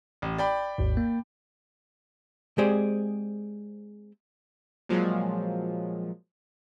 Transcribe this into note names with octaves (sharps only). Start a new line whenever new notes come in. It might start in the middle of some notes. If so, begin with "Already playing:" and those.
A1
D5 G5 B5
G#1 D#2 G#2
A#3
G#3 C4 G4 G#4 C5 D5
A#2 F3 F#3 G#3